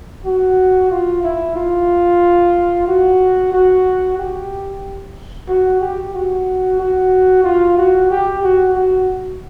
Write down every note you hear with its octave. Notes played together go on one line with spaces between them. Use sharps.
F#4
F4
E4
F4
F#4
F#4
G4
F#4
G4
F#4
F#4
F4
F#4
G4
F#4
F#4